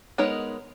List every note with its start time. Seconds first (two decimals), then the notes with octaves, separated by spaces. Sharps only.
0.18 G#3 B3 D#4 A#4 C#5